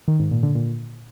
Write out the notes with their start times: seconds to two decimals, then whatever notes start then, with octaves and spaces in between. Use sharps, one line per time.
0.08 D#3
0.19 G#2
0.31 A#2
0.43 D3
0.55 A#2